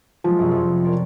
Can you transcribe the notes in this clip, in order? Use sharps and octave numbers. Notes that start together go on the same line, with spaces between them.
F3 F#3 G#3
C2 F#2
F2
A#4 C#5 D5